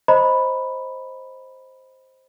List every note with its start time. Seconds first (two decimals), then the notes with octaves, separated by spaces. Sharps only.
0.08 C5 D#5 A#5 B5